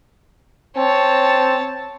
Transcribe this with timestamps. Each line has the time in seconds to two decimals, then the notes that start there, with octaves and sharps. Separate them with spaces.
0.77 C4 C#5 A5